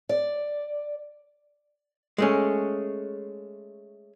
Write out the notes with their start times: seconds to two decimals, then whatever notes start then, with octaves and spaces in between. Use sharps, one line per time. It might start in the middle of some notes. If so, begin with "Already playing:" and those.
0.09 D5
2.18 G#3 A3 C#4